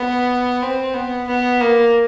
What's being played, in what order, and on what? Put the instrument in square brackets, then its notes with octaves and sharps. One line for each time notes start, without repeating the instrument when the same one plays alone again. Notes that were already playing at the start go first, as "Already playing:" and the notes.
Already playing: [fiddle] B3
C4
B3
B3
A#3